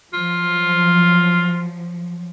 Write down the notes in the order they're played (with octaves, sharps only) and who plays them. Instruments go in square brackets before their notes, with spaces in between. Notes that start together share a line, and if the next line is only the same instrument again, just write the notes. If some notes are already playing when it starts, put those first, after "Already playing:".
[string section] F3 F#3 [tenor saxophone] F4